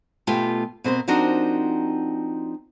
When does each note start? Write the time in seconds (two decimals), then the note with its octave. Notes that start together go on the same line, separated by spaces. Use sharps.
0.27 B2 A3 F4 G4 G5 G#5
0.84 B2 C4 A#4 C5
1.08 F3 C4 D4 D#4 F#4 A#4